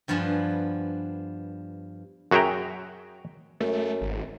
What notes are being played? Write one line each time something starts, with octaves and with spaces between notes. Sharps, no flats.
G2 F3 B3 D4 B4 G#5
F#2 F#4 G#4 E5 G5 A#5
F#2 A3
G#1